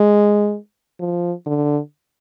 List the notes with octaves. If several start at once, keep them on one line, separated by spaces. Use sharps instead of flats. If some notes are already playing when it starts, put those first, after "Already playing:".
Already playing: G#3
F3
D3